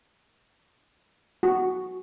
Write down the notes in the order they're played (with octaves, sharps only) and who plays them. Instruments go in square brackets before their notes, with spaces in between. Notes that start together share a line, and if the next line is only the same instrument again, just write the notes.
[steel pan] F#4